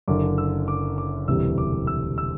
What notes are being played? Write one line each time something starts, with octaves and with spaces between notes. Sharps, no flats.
F#1 F#2 D3 D6
E6
D6
D6
E1 D2 C3 E3 G3 E6
D6
E6
E6